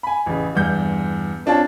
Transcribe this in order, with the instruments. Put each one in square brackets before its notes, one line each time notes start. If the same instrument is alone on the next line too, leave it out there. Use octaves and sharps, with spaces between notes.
[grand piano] G#5 B5
A1 C#3
E2 G2 G6
C4 D4 F4 C#5 A5